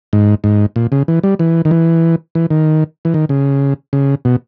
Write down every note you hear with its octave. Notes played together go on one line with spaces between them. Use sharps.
G#2
G#2
A#2
C#3
E3
G3
E3
D#3
E3
E3
D#3
E3
D#3
C#3
C#3
B2